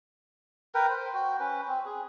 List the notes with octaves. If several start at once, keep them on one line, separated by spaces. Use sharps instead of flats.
A#4 B4 G5
C5
F#4 G5
C#4 B4
C4
G#4